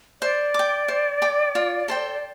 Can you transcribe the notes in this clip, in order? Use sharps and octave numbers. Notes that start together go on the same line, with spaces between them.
C5 D5
G5 D6
C5
G5 D6
F4
A4 C5 G5